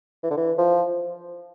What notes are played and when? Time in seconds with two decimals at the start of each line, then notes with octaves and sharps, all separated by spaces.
0.23 E3
0.31 D3
0.37 E3
0.58 F3